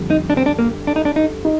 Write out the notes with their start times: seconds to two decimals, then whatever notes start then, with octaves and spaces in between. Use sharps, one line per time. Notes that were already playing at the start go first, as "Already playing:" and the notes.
Already playing: F2 D3 G3
0.10 D#4
0.30 D4
0.37 C4
0.46 D4
0.59 A#3
0.87 D4
0.96 D#4
1.05 D4
1.16 D#4
1.45 D#4